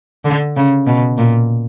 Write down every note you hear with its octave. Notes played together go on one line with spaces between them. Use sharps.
D3
C#3
B2
A#2